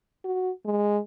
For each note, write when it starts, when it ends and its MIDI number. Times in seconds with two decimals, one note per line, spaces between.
0.24 0.50 66
0.65 0.98 56